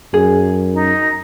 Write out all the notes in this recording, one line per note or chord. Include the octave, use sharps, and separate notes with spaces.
F#2 G#4
D#4